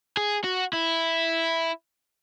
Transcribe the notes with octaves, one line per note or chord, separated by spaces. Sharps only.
G#4
F#4
E4